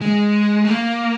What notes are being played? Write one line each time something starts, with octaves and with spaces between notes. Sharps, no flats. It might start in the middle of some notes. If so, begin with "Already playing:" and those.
G#3
A3
A#3